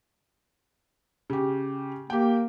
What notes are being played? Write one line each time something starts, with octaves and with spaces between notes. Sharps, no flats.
C#3 G4
A#3 G4 G5